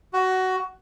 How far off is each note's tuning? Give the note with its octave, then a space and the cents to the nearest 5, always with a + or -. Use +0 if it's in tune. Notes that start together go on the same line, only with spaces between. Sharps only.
F#4 +15